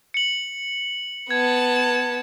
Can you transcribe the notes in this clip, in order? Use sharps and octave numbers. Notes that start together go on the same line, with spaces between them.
C#7 F#7
B3 A5 G#6